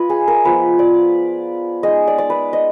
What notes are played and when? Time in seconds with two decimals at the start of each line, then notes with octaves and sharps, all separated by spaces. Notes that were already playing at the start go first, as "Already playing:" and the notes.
Already playing: F4 B4 D#5
0.09 G#4
0.28 A#4
0.45 F3 B3 F4 B4
0.79 D5
1.83 G#3 D#4 D#5
2.07 D5
2.18 D5
2.30 B4
2.53 D#5